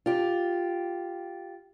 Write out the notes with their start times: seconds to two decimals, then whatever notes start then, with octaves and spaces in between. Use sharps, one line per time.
0.06 F4 G4